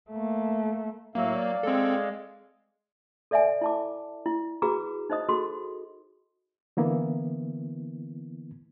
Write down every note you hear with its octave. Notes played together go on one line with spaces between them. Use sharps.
A3 A#3
A2 F#3 A#3 E5 F5
D5 F5
G#3 C4 A4
A4 D5 E5 F#5 G#5
E4 A5 D6
E4
F#4 G#4 B4 A#5 D6
D#4 C5 D#5 D#6
F#4 G#4 A4 C6
D3 E3 A#3 B3 E4